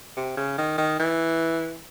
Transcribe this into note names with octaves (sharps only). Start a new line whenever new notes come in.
C3
C#3
D#3
D#3
E3